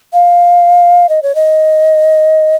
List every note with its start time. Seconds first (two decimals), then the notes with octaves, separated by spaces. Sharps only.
0.13 F5
1.09 D#5
1.23 C#5
1.35 D#5